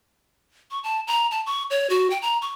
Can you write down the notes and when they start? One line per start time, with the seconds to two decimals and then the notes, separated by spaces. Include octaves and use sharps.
0.71 C#6
0.84 A5
1.07 A#5
1.31 A5
1.46 C#6
1.70 C#5
1.90 F#4
2.10 G5
2.22 A#5
2.42 C#6